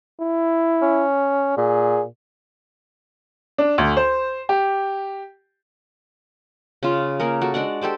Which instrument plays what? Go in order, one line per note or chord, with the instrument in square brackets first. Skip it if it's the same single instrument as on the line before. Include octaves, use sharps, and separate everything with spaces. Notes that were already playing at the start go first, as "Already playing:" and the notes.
[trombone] E4
[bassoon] C#4
[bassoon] A#2 [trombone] G#4
[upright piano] D4
D2
C5
G4
[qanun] C#3 F4
A#3 G#4 A#4
F#4 A4
G#3 D4 D5 F#5
G4 A4 C5 D5